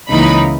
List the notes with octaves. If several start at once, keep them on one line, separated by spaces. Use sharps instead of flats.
C#2 C#3 E3 A#3 D#4 B5